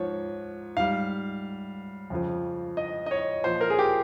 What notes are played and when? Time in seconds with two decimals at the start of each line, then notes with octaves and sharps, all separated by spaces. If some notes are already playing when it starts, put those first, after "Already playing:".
Already playing: G#2 F3 C#5
0.77 G#2 G3 F5
2.10 F2 C#3 F3
2.77 D#5
3.06 D#5
3.11 C#5
3.44 A#2 F3 C5
3.61 A#4
3.70 G#4
3.79 G4